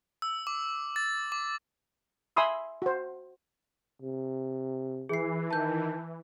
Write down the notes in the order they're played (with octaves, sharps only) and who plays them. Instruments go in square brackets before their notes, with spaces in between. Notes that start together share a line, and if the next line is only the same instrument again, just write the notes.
[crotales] E6
D6
A6
D6
[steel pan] E5 G#5 B5 C6 D#6 E6
F#4 C5
[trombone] C3
[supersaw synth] E3 [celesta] G#4 C7
[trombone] D#3 [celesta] A5 G6